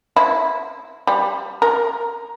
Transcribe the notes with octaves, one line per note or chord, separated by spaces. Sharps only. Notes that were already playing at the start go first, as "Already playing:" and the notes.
E4
G3
A#4